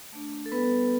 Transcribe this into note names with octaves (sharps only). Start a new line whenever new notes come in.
A3 D4
A4
G3 B3 E4 B4